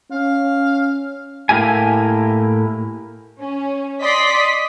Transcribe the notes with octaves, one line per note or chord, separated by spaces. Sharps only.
C#4 F5
A2 A#3 E4 G4 G#5
C#4
D5 D#5 C6 B6